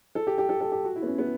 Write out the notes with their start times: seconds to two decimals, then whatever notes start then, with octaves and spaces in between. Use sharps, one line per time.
0.15 A4
0.27 G4
0.38 G4
0.49 A4
0.61 A4
0.72 G4
0.85 F#4
0.96 E4
1.02 B3
1.07 C#4
1.18 B3